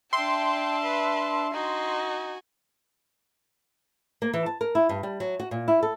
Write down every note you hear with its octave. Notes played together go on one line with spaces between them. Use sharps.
D4 E5 G5 A5 C6
B4
D#4 F#4 G#5
A#3
E3
A5
A#4
E4
G2
G3
F#3
F#4
A#2
E4
A4